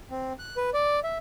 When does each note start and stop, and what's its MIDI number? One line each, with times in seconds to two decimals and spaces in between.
0.11 0.33 60
0.39 0.57 90
0.57 0.70 71
0.74 1.00 74
1.04 1.18 76